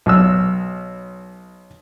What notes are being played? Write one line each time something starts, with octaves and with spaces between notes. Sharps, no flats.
B1 E6